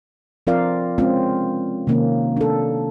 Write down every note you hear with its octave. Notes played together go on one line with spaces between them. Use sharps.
F3 C4 F4 A#4 D5 F5
G#3 C4 C#4 F4
C3 D#3 A#3 C#4
D4 A4